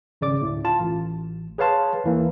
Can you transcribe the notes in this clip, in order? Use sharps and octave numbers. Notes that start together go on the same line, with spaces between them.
G#1 C#3 D5 D6
D2 A2
F4 A5
A1
G#4 B4 C#5 F5 A5 C6
D#2 E3 A#3